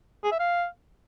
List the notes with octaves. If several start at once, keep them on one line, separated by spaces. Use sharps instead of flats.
G#4
E5
F5